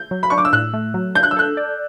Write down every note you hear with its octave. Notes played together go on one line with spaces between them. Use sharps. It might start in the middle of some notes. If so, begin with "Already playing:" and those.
Already playing: G6
F#3
B5
D4 C#6
D6
E6
A2 F#6
A3
F#3
D4 G6
F#6
E6
A4 F#6
D5